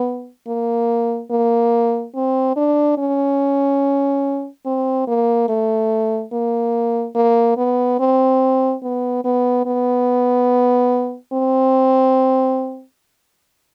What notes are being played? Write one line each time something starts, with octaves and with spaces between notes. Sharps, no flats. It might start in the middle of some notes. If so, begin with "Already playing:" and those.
Already playing: B3
A#3
A#3
C4
D4
C#4
C4
A#3
A3
A#3
A#3
B3
C4
B3
B3
B3
C4